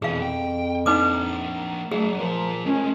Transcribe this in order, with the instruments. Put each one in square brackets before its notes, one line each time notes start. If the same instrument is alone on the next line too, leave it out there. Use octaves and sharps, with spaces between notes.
[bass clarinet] F2 [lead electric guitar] B2 E3 [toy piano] G#4 F5
[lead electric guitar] G5
[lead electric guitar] A#3 D4 [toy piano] D#4 B4 D6
[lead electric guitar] F#3 A#3 [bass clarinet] A3 [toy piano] G#4
[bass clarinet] F3 [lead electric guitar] F4 A#4
[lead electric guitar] G#3 A3 [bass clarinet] C#4